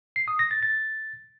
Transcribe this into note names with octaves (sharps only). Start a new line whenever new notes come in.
C7
D#6
A#6
A6
A6